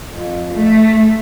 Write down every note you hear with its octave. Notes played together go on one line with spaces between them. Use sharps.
F2
A3